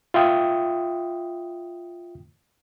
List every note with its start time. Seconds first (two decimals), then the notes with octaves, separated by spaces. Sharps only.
0.14 F4 E5 G5 D#6